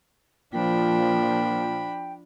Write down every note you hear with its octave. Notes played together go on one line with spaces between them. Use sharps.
A#2 F3 D4 G5 B5